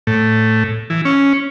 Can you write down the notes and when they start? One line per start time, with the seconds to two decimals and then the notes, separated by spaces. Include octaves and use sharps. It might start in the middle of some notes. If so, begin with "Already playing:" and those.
0.07 A2
0.90 E3
1.05 C#4